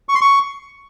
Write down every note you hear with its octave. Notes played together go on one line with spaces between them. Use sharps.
C#6
C6
C#6